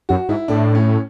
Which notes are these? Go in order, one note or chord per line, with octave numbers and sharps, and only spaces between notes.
F#2 F#4
G#2 E4
A2 D4
C#4